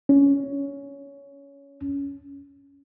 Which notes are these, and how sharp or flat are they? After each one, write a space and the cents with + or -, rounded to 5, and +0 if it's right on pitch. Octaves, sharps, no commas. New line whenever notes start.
C#4 +15